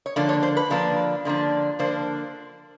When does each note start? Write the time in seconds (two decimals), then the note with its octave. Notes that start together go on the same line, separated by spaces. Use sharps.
0.06 C#5
0.16 D3 F3 A#3 D4 D5
0.29 C#5
0.43 C5
0.57 B4
0.70 D3 F3 A#3 D4
1.25 D3 F3 A#3 D4
1.79 D3 F3 A#3 D4 C5